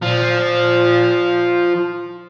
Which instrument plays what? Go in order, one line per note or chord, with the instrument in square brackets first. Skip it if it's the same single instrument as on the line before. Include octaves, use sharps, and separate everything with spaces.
[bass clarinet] A#2 [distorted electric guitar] F3